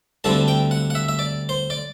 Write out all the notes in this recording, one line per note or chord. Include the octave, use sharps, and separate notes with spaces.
D2 D3 G3 C4 E4 A5
G5
F#5
F#5
E5
E5
D5
C5
D5